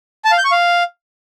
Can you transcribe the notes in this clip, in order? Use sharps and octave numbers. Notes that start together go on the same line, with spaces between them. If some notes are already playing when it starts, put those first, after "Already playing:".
A5
F5
G6
C#6
F5